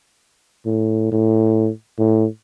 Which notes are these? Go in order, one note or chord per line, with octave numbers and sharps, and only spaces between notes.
A2
A2
A2